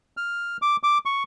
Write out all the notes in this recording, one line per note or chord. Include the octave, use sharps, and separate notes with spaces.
F6
D6
D6
C#6